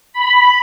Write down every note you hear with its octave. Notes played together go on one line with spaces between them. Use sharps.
B5